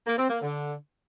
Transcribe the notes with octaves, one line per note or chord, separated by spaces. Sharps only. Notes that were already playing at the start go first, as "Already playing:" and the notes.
A#3
C4
A#3
D3